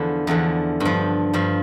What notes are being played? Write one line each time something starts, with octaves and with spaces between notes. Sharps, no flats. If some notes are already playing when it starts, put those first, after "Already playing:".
Already playing: E2 D3 F3
E2 D3 F3
G2 F3
G2 F3